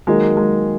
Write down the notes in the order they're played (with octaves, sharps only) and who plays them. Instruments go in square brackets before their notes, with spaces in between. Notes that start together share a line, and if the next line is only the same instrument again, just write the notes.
[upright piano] D#3 F#3 A#3 D#4 G#4 [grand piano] G#3
[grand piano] G#3